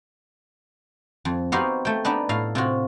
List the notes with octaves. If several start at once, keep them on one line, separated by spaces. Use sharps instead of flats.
F2
B3 C4 D#4 F#4 G4 F5
A3 G5
B3 D4 D#4 B4
A2 F5
C3 F4 F#4